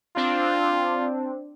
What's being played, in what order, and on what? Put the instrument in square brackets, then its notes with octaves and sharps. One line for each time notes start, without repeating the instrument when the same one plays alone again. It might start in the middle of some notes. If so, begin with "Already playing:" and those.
[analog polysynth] C4 D4 [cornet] F4